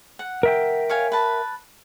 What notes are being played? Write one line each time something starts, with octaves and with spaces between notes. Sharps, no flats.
F#5
A#4 E5 G5
C#5 F5 G#5
B4 A5